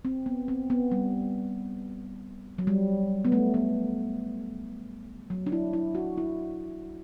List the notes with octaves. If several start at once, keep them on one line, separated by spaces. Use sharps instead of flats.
C4
B3
C4
B3
G3
F#3
G3
B3
A3
B3
F#3
D4
E4
E4
F#4
E4